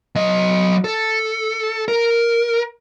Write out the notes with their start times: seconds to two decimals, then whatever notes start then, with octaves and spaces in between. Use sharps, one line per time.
0.16 F#3 D#5
0.84 A4
1.88 A#4